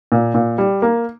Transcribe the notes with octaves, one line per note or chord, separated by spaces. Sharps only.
A#2
A#2
G3
A#3